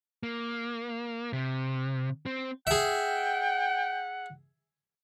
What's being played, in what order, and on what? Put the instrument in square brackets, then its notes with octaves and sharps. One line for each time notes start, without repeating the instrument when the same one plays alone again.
[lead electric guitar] A#3
C3
C4
[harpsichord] G#4 E5 [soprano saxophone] F#5 [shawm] G5